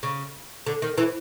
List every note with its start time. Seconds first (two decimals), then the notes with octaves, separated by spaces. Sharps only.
0.03 C#3
0.66 D3
0.82 D#3
0.98 E3